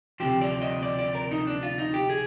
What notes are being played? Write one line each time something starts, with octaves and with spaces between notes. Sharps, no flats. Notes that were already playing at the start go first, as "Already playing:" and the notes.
D2 C3 F3 G4
D5
D#5
D5
D5
A#4
D#4
D4
F4
D#4
G4
G#4